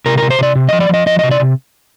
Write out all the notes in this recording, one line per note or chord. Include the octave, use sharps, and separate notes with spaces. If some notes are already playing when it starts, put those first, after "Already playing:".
C3 A#4
A#4
C3
C5
C3 D5
C3
D#5
F3
D5
F3 D#5
F3 D#5
D#5
C3
D5
C3